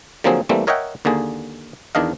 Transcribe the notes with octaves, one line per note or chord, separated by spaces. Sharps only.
D3 F3 F#3 A#3 C4 G#4
E3 G3 A3 A#3 C4
A#4 C#5 D#5 E5 F#5 G5
D#2 D3 A#3 G#4
E2 D#3 D4 D#5 F5